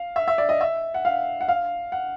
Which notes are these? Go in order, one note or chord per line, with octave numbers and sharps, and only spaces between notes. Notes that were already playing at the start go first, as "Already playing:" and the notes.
Already playing: F5
E5
E5
D5
D#5
E5
F#5
F5
F#5
F5
F#5